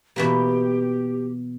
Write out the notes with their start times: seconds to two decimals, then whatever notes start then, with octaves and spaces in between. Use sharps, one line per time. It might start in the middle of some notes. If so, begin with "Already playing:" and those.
0.16 B2 E3 A#3 G4